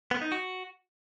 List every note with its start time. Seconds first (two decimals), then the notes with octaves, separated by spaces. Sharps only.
0.11 B3
0.21 D#4
0.32 F#4